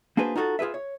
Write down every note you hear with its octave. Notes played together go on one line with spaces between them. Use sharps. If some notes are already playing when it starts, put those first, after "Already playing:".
A#3 D4 F#4 G#4 B4 C5
D#4 F4 F#4 G#4 A4
F4 G#4 A4 B4 E5
C#5